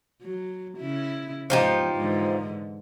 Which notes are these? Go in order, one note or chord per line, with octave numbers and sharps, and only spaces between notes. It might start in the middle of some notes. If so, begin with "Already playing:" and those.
F#3
C#3 E4
E2 G#2 F3 D#4 G4
G#2 D3 E3